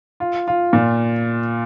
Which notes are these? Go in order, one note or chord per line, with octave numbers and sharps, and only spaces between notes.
F4
F4
A#2